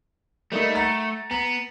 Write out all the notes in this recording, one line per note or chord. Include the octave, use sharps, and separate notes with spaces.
G3 A3 A#3 D#4
F#5 A#5 A6
B3 A#5